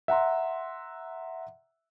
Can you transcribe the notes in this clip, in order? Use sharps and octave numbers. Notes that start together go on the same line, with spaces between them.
E5 F#5 A#5 C6